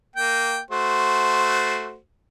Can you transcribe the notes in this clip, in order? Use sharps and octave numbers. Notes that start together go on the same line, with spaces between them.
A#3 G5
A3 F#4 C5